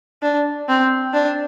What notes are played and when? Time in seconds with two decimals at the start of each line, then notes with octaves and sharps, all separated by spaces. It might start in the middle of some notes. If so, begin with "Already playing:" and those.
0.22 D4
0.69 C4
1.13 D4